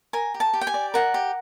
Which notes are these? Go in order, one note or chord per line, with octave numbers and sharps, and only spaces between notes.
A#4 G#5
G4
A5
G4
G5
G#5
D5
A#4 F#5
G4